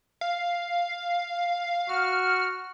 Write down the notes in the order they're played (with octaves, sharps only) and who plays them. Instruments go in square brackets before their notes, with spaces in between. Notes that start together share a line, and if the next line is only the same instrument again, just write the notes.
[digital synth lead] F5
[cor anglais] F#4 [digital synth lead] F6